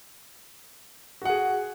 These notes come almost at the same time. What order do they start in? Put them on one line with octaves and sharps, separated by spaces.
F#4 F#5 G#4